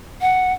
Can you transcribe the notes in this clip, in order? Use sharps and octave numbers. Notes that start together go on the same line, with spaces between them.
F#5